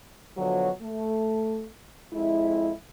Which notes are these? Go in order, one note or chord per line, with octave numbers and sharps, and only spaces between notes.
B2 D3 F3 F#3
A3
F2 G#3 E4